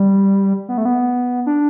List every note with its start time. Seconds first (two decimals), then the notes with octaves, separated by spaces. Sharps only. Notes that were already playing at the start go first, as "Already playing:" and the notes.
Already playing: G3
0.69 B3
0.78 A3
0.85 B3
1.46 D4